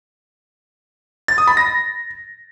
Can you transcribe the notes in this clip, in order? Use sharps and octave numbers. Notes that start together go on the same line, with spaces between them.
A6
D#6
B5
A#6